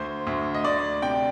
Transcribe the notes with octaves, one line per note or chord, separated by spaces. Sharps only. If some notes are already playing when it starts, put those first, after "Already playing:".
Already playing: D2 C5
D2
D#5
D2 D5
C3 G5